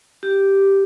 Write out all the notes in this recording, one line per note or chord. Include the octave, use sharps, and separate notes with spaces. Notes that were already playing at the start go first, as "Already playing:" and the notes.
G4